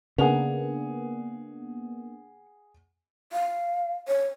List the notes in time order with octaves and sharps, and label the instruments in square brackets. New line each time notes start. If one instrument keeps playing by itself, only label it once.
[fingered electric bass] C#3 [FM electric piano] A#3 B3 D4 [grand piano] G#4 F#5 F7
[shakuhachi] F5
C#5